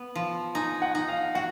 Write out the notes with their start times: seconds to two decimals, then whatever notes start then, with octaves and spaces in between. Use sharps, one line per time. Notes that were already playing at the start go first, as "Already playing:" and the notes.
Already playing: B3
0.15 F3
0.55 D#4 G#5
0.82 F#5
0.95 D#4
1.08 F5
1.35 F#4 F#5